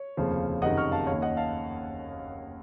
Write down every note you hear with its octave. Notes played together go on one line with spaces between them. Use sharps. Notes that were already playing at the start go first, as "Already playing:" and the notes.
Already playing: C#5
F1 D#2 C#3 F3
F#1 F2 C3 D#3 D#5 F#5
C#6 F6
F5 A5
D#2 D#3 C#5 F5
D#5 F#5
F5 A5